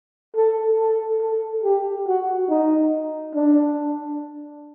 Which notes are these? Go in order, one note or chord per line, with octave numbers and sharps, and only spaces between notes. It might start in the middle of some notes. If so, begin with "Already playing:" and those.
A4
A4
A4
G4
F#4
D#4
D4